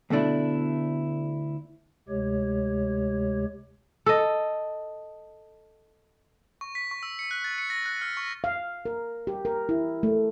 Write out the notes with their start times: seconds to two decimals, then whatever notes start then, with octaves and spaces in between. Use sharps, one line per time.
0.10 D2 B2 A3 D4 E4
2.09 D2 C3 G#3 G4 C#5
4.06 A4 D#5
6.61 C#6
6.75 B6
6.91 C#6
7.03 E6
7.19 C#7
7.31 F#6
7.44 A6
7.58 C#7
7.70 A#6
7.86 F#6
8.01 F6
8.17 C#6
8.44 F5
8.85 A#4
9.27 G4
9.45 A#4
9.69 E4
10.03 A3